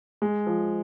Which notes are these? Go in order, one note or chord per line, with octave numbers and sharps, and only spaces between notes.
G#3
F3